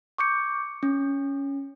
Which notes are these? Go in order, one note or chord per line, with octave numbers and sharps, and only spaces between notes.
C#6 D6 G6 C#7
C#4